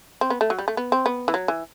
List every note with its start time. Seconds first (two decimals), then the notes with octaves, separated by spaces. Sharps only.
0.21 C4
0.30 B3
0.41 A3
0.50 F#3
0.59 G3
0.68 A3
0.77 B3
0.92 C4
1.06 B3
1.28 E3
1.34 F#3
1.48 E3